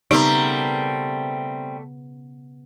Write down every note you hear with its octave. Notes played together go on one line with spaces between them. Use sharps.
C#3 G3 A3 B3 C4 D#4 A#4